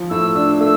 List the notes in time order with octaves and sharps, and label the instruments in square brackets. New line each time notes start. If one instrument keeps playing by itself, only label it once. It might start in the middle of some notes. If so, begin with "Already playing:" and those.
Already playing: [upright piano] F3
[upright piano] A2 [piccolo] E6
[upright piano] D4 [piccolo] E6
[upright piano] A3 [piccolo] E6